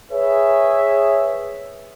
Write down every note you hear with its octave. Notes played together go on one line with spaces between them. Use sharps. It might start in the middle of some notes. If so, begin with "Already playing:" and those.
G#4 B4 C#5 E5